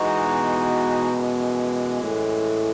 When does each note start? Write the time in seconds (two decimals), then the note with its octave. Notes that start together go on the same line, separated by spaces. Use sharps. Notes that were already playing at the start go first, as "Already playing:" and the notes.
Already playing: E3 G#3 D#4 F#4
0.23 B2
1.12 F#2 E3 G#3
2.03 A2